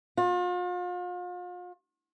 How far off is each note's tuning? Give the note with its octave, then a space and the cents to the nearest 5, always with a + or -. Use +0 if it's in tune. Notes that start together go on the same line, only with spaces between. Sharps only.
F4 +40